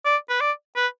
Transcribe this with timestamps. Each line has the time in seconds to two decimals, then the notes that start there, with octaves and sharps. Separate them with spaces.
0.05 D5
0.29 B4
0.40 D5
0.76 B4